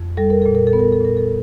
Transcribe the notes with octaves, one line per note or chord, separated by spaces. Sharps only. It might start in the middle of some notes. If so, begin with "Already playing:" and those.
Already playing: F2
G3 A4
A#4
A#2 A4
A#4
A4
B3
A#4
A4
A#2 A#4
A4